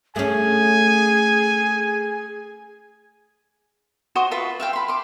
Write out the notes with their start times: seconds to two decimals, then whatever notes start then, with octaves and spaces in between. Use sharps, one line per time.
0.16 A3 C#4 G#4 G#5
4.15 F#4 C5 D#5 D#6
4.31 F4 B4 E5
4.60 E5 F5 G5
4.73 B5 C6
4.88 C6 D6